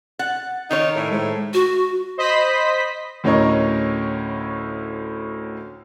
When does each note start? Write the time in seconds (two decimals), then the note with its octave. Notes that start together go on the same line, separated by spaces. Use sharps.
0.19 F#5 A6
0.71 D#3 D#4 A#4 C#5
0.96 A2 A4 D5
1.11 A2 G#3 C5
1.53 F#4
2.18 C5 D#5 B5 B6
3.24 D2 A2 C#4 A#4 C#5 D#5